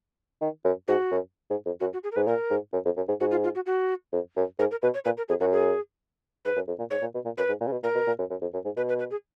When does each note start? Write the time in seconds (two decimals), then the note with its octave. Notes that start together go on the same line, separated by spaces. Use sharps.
0.41 D#3
0.64 F#2
0.88 G#2 F#4
1.11 F#2
1.50 G#2
1.66 F2
1.80 F#2 F#4
1.93 F#4
2.03 G#4
2.12 A#4
2.16 G#2 B4
2.27 A#2 A#4
2.50 G#2
2.73 F#2
2.85 F2
2.97 F#2
3.08 G#2
3.20 G#2 F#4
3.31 F4
3.44 F4
3.55 F#4
3.66 F#4
4.12 F2
4.36 F#2
4.59 G#2 A#4
4.71 A#4
4.82 B2 B4
4.94 C#5
5.05 A#2 B4
5.17 A#4
5.29 F2 G#4
5.40 F#2 F#4
5.52 G#4
6.45 G#2 B4
6.56 F#2
6.67 F2
6.79 A#2
6.90 G#2 C#5
7.02 A#2
7.14 B2
7.25 A#2
7.38 F#2 B4
7.49 G#2
7.60 A#2
7.67 C#3
7.72 B2
7.83 A#2 A#4
7.95 B2
8.07 A#2
8.19 F#2
8.30 F#2
8.41 F2
8.54 F#2
8.65 G#2
8.77 B2 B4
8.89 B4
8.99 B4
9.11 G#4